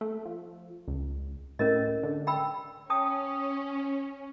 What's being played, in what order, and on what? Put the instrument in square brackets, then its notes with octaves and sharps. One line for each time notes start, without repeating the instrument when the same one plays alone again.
[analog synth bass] A3
F3
C#2
[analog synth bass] A2 [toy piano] C#4 A#4 D#5
[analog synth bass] D3
[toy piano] G5 B5 E6
[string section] C#4 [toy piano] G5 A5 D#6